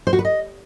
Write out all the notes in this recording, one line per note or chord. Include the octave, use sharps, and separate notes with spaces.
C5
F#4
B4
D#5